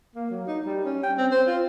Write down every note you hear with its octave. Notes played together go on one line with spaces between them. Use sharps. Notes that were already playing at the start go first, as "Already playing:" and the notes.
A#3
F#3
D#4
G3
C#4
G5
C4
C5
F4